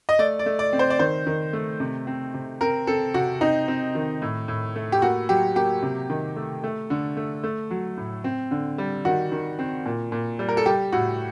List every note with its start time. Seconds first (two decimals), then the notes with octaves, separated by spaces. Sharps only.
0.09 D#5
0.19 A3 D5
0.39 D5
0.46 A3
0.59 D5
0.73 C4
0.79 C5
0.90 D5
0.99 D#3 C5
1.26 D#3
1.53 A3
1.80 C3
2.07 C4
2.34 C3
2.61 C4 A#4
2.87 C4 A4
3.14 C3 F#4
3.41 C4 D#4
3.68 C4
3.95 D#3
4.22 A2
4.48 A2
4.75 A3
4.92 G4
5.02 A#3 F#4
5.29 F#3 G4
5.56 A#3 G4
5.82 C3
6.10 D#3
6.36 A3
6.64 A3
6.90 D3
7.17 A3
7.44 A3
7.70 F#3
7.97 A2
8.24 C4
8.51 D3
8.78 G3
9.05 D#3 F#4
9.32 D#3
9.59 C4
9.86 A#2
10.12 A#2
10.39 G3
10.48 A#4
10.57 A4
10.66 G3 G4
10.92 A2 F#4